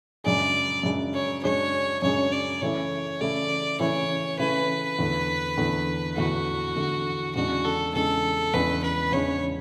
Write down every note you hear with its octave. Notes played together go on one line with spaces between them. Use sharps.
F#2 C#3 G#3 D4 G#4 D5
F#2 C#3 G#3 D4 G#4
C#5
F#2 C#3 G#3 D4 G#4 C#5
F#2 C#3 G#3 D4 G#4 C#5
D5
C#3 E3 A3 E4 C#5
C#3 E3 A3 E4 D5
C#3 E3 A3 E4 C#5
C#3 E3 A3 E4 B4
E2 D3 A3
E2 D3 A3
E2 D3 A3 F#4
E2 D3 A3
E2 C#3 G#3 D4 F#4
A4
E2 C#3 G#3 D4 A4
E2 C#3 G#3 D4 B4
B4
E2 C#3 G#3 D4 C#5